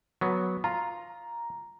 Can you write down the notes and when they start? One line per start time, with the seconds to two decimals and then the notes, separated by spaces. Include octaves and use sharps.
0.21 F#3 B3
0.64 F4 A#5